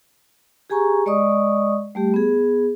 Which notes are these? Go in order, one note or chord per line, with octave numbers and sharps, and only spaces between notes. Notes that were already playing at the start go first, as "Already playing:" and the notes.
G4 G#4 G#5 A#5 C#6
G#3 D5 D#5 C#6 D#6
G3 A3 G4
B3 G#4